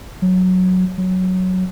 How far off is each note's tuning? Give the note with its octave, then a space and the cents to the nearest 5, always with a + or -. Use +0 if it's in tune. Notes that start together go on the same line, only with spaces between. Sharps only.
F#3 -5
F#3 +0